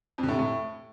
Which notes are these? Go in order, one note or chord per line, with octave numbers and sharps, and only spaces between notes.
F2
D3
A2
C3
A2